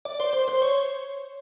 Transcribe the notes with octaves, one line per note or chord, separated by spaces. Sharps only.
D5
C5
C5
C5
C#5